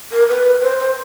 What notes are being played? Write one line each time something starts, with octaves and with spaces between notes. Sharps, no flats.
A#4
B4
C5
C5